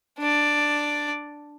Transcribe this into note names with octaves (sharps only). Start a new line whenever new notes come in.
D4 D5